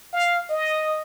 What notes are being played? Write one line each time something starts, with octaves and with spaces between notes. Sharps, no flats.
F5
D#5